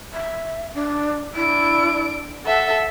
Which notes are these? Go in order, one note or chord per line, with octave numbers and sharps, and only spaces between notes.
E5
D4
D4 E4 D7
A4 E5 F#5